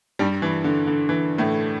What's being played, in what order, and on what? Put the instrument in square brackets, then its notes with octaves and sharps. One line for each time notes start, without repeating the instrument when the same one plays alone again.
[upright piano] G2 G3
E3
D3
D3
E3
A2 A3